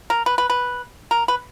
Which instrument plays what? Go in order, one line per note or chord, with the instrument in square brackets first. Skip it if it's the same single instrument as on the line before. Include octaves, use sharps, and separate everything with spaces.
[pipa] A#4
B4
B4
B4
A#4
B4